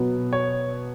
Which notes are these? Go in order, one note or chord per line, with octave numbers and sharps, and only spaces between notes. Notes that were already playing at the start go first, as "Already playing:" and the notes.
Already playing: B2 F#3 B3
C#5